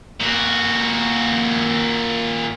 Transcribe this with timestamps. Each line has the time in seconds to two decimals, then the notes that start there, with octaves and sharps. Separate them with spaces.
0.21 A#2 F#4